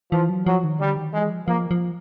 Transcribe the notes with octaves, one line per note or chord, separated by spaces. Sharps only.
E3 F3
F#3
F3 F#3
D#3
D3 G3
D#3
E3 G#3
F3
F3 A#3
F3